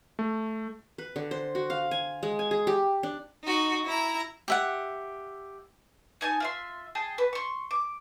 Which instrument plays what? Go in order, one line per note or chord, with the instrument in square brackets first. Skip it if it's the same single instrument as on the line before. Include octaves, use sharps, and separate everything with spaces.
[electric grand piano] A3
[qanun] B4
D3
C5
F#4
F5
G#5
G#3
G#5
G#4
G4
D4
[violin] D#4 F#4
E4 A#5
[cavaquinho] G4 E5 F#5
[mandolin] D#4 G#5 A5
F4 E5 C6
G#4 G5 A5
B4
C6 C#6
D6